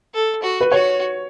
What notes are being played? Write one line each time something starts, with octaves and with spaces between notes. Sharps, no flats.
A4
F#4
B4
F#4 C#5